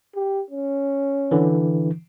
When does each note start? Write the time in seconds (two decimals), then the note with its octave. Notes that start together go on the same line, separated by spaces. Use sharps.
0.15 G4
0.50 C#4
1.31 D3 E3